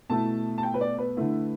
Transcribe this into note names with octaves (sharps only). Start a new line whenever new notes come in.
B2 A3 E4 A5
A5
G5
B4
D5
B4
D3 A3 E4